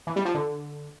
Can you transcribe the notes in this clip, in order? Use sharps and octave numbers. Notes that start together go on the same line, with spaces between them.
E3
G3
F3
D3